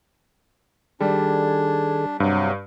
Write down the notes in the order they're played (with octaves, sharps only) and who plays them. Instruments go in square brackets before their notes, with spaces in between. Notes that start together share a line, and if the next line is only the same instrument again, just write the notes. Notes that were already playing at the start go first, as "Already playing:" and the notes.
[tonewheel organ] D#3 G#4 A4 [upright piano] G3 [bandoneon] D4
[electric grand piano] G2 [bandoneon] C3 F#3